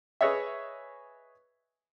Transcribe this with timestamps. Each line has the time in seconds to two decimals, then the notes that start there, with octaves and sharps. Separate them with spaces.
0.21 G#4 B4 C#5 D#5 E5